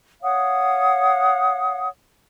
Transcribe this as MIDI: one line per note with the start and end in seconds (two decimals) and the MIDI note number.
0.22 1.88 73
0.22 1.88 77
0.22 1.88 78
0.22 1.88 87